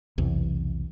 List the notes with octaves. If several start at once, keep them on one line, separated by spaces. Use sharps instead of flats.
B1 E2 C3 E3